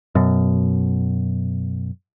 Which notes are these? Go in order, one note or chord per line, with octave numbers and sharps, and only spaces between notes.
F#2 B2